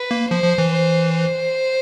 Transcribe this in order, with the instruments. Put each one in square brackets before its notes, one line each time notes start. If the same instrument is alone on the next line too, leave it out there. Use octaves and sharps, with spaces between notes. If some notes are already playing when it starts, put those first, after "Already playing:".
Already playing: [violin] B4
[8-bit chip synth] A#3
[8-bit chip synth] F3 [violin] C5
[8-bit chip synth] F3
E3
[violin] C5
C5